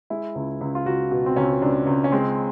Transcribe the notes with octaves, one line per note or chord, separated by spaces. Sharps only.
G#3 E4
C#2
C#2
F4
C#2 F#4
B2
C4
C#2 C#4
C#2 D4
C#2
C#4
G#3 C4